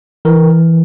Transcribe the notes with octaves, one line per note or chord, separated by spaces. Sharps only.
E3 A#4